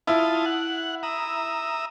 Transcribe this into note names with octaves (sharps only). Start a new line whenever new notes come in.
E4 F4 A5 D#6
F#5
E5 A#5 D#6